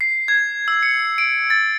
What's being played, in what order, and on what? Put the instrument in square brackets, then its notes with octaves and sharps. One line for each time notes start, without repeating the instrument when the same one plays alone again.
[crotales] C7
G#6
E6
C#7
D7
A6